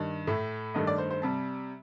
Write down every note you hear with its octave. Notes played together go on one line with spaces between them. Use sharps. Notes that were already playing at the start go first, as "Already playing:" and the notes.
Already playing: G2 D#3
A2 A3
G2 D#3 A3 D#5
D5
C5
C5
C3 G3 A5